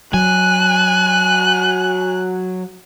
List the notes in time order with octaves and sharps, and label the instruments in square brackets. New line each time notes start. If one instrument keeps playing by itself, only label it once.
[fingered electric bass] F#3 [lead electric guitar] G#5 [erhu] F#6